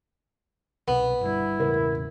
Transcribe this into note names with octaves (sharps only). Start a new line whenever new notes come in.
C2 B2 B3
G1 G2 E4
E1 A1 C#3 A#4